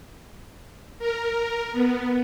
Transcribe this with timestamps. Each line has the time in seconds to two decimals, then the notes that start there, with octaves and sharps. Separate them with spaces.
0.99 A#4
1.72 B3